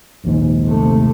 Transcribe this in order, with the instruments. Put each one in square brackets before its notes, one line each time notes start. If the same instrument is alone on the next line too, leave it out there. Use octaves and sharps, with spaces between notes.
[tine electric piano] A#1 D#2 G#2
[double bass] C3 A3